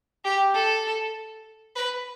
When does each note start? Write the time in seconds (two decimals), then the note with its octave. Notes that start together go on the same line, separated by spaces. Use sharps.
0.25 G4
0.54 A4
1.76 B4